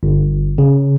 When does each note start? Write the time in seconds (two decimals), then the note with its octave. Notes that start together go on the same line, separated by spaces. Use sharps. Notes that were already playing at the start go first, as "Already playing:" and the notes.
0.03 G1
0.58 C#3